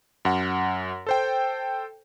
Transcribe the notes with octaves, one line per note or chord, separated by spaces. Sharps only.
F#2 F#5
A4 C5 G5